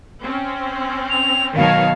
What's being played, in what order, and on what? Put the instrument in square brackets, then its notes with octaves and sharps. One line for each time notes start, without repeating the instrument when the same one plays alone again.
[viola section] C4 C#4
[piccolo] F7
[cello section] B2 D#3 F#3 [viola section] C#5 A5 [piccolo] F5